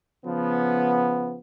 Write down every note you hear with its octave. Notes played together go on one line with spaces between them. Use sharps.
C#3 F3 B3